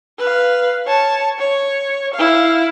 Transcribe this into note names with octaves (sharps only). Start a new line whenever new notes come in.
B4 F5
C#5 A5
C#5
E4 F5